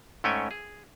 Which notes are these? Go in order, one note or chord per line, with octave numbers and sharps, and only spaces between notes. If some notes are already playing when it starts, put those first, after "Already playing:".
G#2 A3 C#4 C#5 G5 G#5
G#4